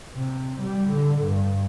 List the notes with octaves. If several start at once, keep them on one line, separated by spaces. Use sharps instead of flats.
C3
G3
D3
G2